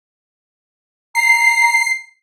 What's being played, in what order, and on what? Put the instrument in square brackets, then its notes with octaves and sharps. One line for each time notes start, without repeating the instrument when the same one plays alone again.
[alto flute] A#5 [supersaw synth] C7